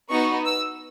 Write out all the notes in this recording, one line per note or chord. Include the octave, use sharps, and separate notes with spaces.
B3 D#4 F#4 C#6
E6